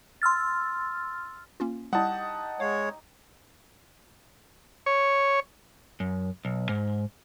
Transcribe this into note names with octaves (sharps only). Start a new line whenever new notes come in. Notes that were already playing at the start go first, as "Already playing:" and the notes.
C6 E6 F6 A6
A#3 C#4 F4
G3 D#4 E4 G4 D#5 F#5 A5
G#3 C#5 F5
C#5
F#2
B1
G#2